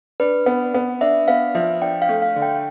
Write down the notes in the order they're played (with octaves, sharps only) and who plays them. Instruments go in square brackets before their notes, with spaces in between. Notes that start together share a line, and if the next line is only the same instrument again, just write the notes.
[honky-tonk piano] D4 [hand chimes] B4
[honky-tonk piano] B3
B3
[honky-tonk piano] D4 [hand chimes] E5
[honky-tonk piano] B3 [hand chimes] F5
[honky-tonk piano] F3 [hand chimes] E5
[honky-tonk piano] D4 [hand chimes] G5
[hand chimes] F5
[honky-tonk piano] A3
[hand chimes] F5
[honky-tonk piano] D3
[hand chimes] G5